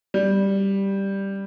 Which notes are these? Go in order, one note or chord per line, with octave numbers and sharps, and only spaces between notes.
G3